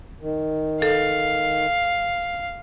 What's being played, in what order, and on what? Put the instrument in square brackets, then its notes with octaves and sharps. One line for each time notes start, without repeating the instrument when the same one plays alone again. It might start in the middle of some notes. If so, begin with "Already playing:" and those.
[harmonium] D#3
[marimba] A4 [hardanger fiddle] F5